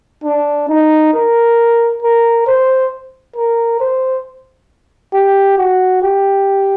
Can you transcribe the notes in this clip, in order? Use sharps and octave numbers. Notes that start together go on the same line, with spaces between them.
D4
D#4
A#4
A#4
C5
A#4
C5
G4
F#4
G4